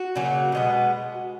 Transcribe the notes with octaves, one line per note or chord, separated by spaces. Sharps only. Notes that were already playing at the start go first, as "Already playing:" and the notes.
Already playing: F#4
C#3 F#3 A#3
B2 G#3 B3